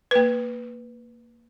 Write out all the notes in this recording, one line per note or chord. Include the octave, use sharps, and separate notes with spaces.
A#3 B4